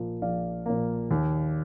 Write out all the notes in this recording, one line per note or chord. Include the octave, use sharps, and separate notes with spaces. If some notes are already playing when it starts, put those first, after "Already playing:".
Already playing: A#1 A#2 F3 A#3
A#1 D5 F5
A#2 F3 A#3
D#2